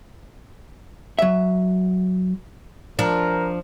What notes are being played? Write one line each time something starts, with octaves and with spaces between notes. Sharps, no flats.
F#3 E5
F3 D4 A#4